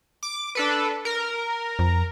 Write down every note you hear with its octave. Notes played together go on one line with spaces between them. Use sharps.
D6
D4 A4 B4
A#4
F2